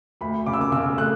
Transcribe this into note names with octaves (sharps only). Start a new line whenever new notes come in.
D2 B5
C#3 D6
E6
D6
C#3 E6
A3 F#6